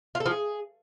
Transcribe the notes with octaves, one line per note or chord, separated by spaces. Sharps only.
F4
A4
F3
G#4